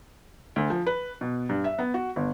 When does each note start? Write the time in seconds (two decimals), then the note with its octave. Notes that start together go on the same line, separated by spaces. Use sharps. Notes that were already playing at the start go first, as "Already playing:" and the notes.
0.56 D2
0.70 F3
0.86 B4
1.21 B2
1.49 G2
1.64 E5
1.79 B3
1.94 F#4
2.16 G1